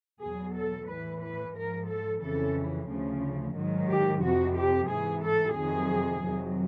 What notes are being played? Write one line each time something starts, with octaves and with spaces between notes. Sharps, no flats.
E2 B2 F#3 G#4
A4
A2 E3 B4
B4
G#2 F3 A#4
A4
F2 C#3 E3 A4
D2 C#3 F3
G#2 D#3 F#3
G4
F2 C3 F3 F#4
G4
G#2 E3 G#4
A4
F2 C3 D#3 F#3 G#4
F2 C3 D#3 F#3